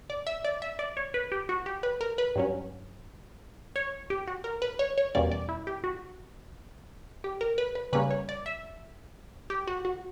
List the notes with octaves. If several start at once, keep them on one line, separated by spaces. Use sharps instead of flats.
D5
E5
D5
E5
D5
C#5
B4
G4
F#4
G4
B4
A#4
B4
G2 F#3 C#4
C#5
G4
F#4
A#4
B4
C#5
C#5
E2 B2 G3 A#3 C#4 D5
D5
E4
G4
F#4
G4
A#4
B4
B4
C#3 G3 A#3 C#4 B4
C#5
D5
E5
G4
F#4
F#4